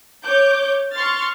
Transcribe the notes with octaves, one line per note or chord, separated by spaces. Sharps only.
C#5 D6 G6
C6 C#6 F6 A6